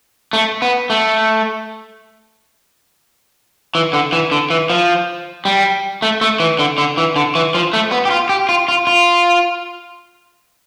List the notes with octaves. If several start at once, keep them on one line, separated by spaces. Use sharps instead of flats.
A3
B3
A3
E3
D3
E3
D3
E3
F3
G3
A3
A3
E3
D3
D3
E3
D3
E3
F3
A3
B3
G4
F4
G4
F4
F4
F4